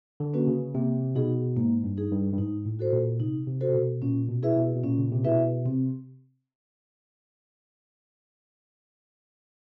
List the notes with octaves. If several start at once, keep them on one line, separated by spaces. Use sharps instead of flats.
D3
A#3 C#4 F#4 B4
C#3
C3 A#3
B2 D#4 G#4
G#2 A#3
G2
D#4 G#4
G2
G2
G#2 D#4
A2
F#4 A4 C5
A#2
C3 D#4
C3
F#4 A4 C5
C3
B2
A#2 C#4
B2
E4 G#4 B4 E5
B2
B2
A#2 C#4
C#3
C3
B2 E4 G#4 B4 E5
C3 C4